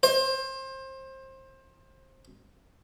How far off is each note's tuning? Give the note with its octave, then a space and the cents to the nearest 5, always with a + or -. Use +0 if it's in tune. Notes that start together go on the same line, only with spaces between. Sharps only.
C5 +25